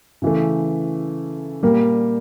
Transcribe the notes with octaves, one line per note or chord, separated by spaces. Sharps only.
C#3 E3 A3
A#2 G3 A#3